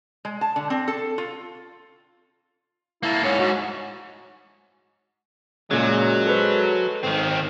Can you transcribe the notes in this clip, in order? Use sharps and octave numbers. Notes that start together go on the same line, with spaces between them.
G#3
A5
D3
C4
A4
F4
A#3 E4 A4
G#2 C#4 C#5
G#2 F#4
A#2 C#3 F#3 G#3
A4 B4 C5
G#1 D#3 C4